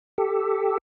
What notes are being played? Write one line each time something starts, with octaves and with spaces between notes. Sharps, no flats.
G4 A4